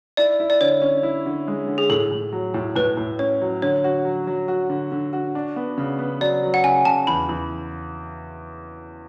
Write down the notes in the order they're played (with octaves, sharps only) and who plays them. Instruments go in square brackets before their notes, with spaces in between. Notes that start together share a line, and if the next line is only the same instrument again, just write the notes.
[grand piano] E4 [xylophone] D5
[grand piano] E4
[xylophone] D5
[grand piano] D3 [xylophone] C#5
[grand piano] C#4
E4
D3
G#3
D3
[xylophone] G#4
[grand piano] A2 [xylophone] A4
[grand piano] A2
F#3
A2
[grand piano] A2 [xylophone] B4
[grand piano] A2
[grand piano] C#4 [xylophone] C#5
[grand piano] F#3
[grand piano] D3 [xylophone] C#5
[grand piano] F#4
F#3
F#3
F#4
D3
D3
F#4
D4
B3
C#3
B3
[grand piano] F#3 [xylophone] D5
[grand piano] F#3
[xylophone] F#5
[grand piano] C#3 [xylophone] G#5
[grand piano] C#3 [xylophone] A5
[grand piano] E2 [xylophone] B5
[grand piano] E2